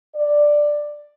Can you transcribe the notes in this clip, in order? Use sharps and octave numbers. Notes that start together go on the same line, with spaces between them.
D5